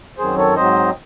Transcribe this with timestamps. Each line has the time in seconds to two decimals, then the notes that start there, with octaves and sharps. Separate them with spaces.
0.18 F#2 D#3 F#3 C4 G#4 C5
0.37 A4 C#5
0.56 G#2 F#3 C4 C5 D#5